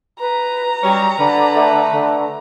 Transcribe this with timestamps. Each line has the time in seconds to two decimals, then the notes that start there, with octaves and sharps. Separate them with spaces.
0.20 B4 A#5
0.82 F#3 G3 C#4 C#5
1.18 D3 B4
1.56 A3
1.91 D3